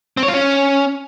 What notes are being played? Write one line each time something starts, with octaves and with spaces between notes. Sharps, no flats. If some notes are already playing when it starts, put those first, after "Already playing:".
C4
C#5
F4
C#4